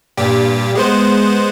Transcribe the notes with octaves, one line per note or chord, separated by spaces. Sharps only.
G2 A#2 G4
G#3 B3 C5